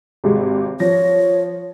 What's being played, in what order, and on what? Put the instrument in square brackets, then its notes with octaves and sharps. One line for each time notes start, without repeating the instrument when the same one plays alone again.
[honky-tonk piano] G#1 C3 G#3
[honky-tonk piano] F3 A#6 [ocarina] C#5